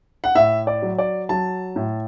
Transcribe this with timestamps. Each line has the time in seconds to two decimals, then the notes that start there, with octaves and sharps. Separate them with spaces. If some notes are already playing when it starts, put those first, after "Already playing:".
0.24 F#5
0.35 A2 E5
0.67 D5
0.82 F#3
0.98 D5
1.29 F#3 A5
1.76 A2